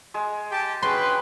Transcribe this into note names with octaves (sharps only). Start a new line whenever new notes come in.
G#3
G4 G5 A5
C#4 F#4 G#4 B4 G5 C6